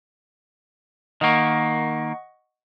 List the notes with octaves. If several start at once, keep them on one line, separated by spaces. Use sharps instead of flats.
D#3 A#3 D#5 F#5 C#6